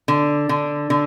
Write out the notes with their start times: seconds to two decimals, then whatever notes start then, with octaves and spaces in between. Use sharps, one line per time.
0.08 D3
0.49 D3
0.90 D3